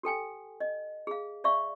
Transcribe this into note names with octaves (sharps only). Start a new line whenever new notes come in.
G4 A4 G5 G#5
D#5
G#4 F5
D5 E5 F5 C#6